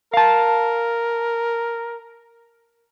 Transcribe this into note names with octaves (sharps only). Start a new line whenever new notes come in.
A#4 F5 A5